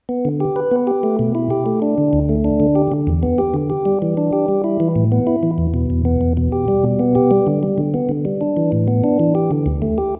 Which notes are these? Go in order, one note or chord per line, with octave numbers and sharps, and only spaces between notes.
B3
D3
G4
B4
B3
G4
A3
B2
E4
G4
A3
D4
D3
D2
A3
D4
D3
G4
D3
E2
B3
G4
D3
G4
G3
E3
D4
G4
G3
E4
E3
A2
B3
E4
E3
E2
B2
E2
B3
E2
B2
G4
G3
B2
B3
G4
G3
D3
G3
D3
B3
D3
G3
D4
E3
A2
B3
D4
E3
G4
D3
D2
A3
G4